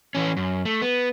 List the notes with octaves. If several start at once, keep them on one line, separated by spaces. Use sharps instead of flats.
E3 C#4
F#2
A3
B3